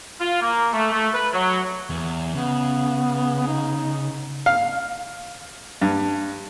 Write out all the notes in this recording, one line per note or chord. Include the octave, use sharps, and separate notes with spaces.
F4
A#3
A3
A3
B4
F#3
E2
C#3 B3
D#4
F5
G2